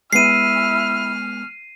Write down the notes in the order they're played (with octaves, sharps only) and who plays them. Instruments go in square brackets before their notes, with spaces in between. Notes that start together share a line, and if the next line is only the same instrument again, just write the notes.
[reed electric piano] G#3 B3 [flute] E4 [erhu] F6 [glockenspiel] C7 D#7